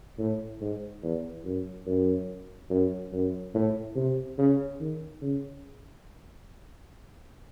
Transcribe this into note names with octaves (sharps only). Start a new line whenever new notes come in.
A2
G#2
E2
F#2
F#2
F#2
F#2
A2
C3
C#3
D#3
C#3